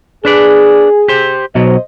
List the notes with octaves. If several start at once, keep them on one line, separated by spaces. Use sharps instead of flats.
D4 G#4 B4 D5
G4 C5
B2 F#3 C5 D#5